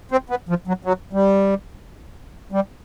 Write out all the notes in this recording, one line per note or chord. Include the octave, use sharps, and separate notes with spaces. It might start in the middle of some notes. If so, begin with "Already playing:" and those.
C4
B3
F3
F#3
F#3
G3
G3